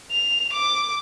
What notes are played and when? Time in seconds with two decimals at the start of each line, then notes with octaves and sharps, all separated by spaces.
0.11 F7
0.52 D6